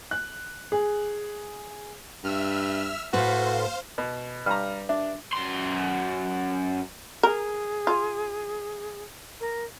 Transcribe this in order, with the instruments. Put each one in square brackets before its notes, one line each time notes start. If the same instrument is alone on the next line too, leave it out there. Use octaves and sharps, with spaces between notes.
[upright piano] F#6
G#4
[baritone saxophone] G2 [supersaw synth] E5 E6 F6
[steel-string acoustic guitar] A2 A4 B4 [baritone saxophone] F#4 [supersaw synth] C5 F5
[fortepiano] B2
[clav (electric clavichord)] G2 [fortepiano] G3 A#5 [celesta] F6
[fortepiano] D4 [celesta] E5
[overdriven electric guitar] F#2 C6
[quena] G#4 [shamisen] A#4
[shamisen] F4
[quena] A#4